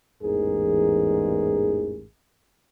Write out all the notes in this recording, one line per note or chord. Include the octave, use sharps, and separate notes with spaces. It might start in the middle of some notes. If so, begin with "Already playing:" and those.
A1 E2 G#2 G#4 A#4